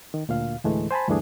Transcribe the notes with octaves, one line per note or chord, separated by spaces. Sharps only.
D#3
D2 A#2 F5
D2 A2 E3 G#3 A3
C5 G#5 A5 B5
D2 G2 E3 A3 D4 G#4